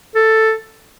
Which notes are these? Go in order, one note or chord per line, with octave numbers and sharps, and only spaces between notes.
A4